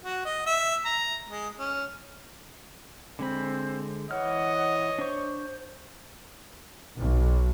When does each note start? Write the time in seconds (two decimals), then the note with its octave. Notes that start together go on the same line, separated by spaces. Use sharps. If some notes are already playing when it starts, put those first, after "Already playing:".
0.04 F#4
0.25 D#5
0.46 E5
0.85 A#5
1.28 G#3
1.58 C#4
3.19 D3 G#3 C4 B5
4.11 E3 C#5 D#5 F#5 F6
4.99 D4 C5 C#6
6.96 B1